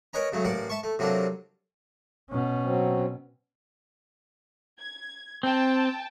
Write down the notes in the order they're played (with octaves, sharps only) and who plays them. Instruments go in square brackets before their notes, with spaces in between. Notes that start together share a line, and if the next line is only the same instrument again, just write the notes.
[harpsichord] A#4 B4 C#5 D#5 G#5 A#5
C#3 F#3 A3
A1 A#3 D5 F#5
E5 A5 C#6
A3
C3 F#3 A3 A#3 D4
[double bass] B2 C#4
[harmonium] F#3 C4
[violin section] G#6
[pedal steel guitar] C4 [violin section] G5 A5